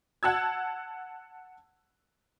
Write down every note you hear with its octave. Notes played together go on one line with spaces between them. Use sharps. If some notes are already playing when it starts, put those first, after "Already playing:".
F#5 A5 E6 G#6